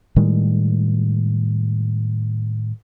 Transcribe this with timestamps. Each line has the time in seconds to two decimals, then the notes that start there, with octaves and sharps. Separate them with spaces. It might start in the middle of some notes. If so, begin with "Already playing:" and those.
0.16 A2 D#3 G3 G#3